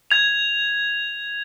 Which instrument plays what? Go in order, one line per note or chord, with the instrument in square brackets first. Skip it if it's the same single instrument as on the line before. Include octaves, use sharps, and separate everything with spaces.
[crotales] G#6 F7